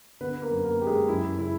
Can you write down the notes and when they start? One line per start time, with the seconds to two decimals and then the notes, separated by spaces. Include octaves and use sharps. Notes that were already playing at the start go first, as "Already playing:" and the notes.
0.21 D3 B3 B4
0.42 A#3 A#4
0.50 F#2 B4
0.64 A#3 A#4
0.80 F#2 G4
0.87 G#3 G#4
1.08 F#2 E4
1.38 C#3 E4